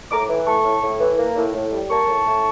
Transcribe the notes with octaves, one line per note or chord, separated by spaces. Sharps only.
A2 A#5 D6
E3
A3 A5 C#6
A2
A2
E3
A#3
A2
A2
G3
A#3 A5 C#6
A2
A2